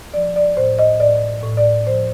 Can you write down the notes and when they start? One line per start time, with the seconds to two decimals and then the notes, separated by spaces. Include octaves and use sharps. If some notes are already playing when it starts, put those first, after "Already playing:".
0.14 F3 D5
0.36 D5
0.57 A2 C5
0.79 D#5
1.00 A2 D5
1.44 A2
1.57 D5
1.86 F3 C5